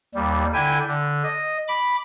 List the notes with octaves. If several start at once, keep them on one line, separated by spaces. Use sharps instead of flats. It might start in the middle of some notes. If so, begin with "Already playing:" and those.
D#2 G3
D3 E4 G5 G#5
D3
D#5
B5 D6